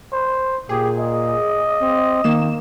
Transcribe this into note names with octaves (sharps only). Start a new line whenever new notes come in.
C5
A#2 G4 G#4
D#5
C4
D#3 A#3 E7